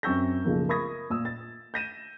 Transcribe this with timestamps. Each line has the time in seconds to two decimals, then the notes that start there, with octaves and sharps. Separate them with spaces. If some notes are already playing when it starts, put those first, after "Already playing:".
0.03 F#2 C4 C#6 E6 G6 A#6
0.45 B1 C#3 F3 A#3
0.69 A#4 B5 C#6 D#6 G#6 A#6
1.10 A#2 D#6 E6
1.25 A6
1.74 G6 A#6 D#7 E7